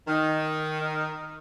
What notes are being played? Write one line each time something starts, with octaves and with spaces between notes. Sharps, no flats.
D#3